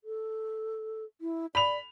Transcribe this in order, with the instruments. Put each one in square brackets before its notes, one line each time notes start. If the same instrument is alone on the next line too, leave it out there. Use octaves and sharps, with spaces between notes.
[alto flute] A4
E4
[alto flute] D5 [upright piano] B5 F7